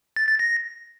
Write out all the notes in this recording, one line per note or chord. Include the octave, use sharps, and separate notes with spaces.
A6
A6
A#6